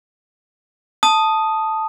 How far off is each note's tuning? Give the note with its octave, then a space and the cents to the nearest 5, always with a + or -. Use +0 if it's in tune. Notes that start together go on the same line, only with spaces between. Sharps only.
A5 +0 D#6 +0